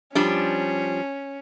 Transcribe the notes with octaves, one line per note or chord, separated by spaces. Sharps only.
F3 G3 C#4 D4